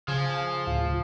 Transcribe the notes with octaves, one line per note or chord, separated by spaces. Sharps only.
C#3 F3 F5 G#5
D2 A2 F4